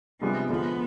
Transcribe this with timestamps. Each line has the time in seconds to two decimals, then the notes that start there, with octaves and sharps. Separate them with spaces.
0.21 C3 F3 G3 G#3 B3 D4
0.50 D3 F3 G#3 B3